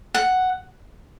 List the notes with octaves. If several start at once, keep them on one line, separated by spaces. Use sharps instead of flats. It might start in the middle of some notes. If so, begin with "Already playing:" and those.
F#5